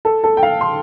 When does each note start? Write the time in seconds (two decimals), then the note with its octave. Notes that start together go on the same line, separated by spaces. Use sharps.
0.05 A4
0.24 A4
0.37 G5
0.43 F5
0.61 C6